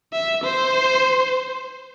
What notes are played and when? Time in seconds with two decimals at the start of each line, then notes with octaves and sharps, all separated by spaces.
0.13 E5
0.44 C5